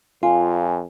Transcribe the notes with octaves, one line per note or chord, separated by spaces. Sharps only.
F2 F4 G#5